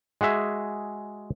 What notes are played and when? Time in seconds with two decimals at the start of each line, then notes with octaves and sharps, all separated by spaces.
0.21 G#3 F#4 G#4 E5